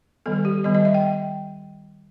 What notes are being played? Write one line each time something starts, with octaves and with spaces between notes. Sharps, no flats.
D#3 G3 B3 A4
G4
D#3 G3 B3 D#5
D#5
E5
G5